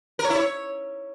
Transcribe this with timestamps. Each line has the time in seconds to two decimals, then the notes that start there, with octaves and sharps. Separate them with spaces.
0.19 A#4
0.25 C#5
0.30 E4
0.35 C#5